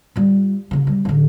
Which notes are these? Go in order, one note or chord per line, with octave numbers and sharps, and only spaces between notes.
G3 F4
F#2 C#3
G3
A1 D3